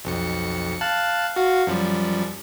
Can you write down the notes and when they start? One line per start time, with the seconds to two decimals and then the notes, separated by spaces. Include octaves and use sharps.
0.05 B1 F2 C#7
0.81 F5 A5 F#6
1.36 F#4 F5
1.67 F#2 F3 G3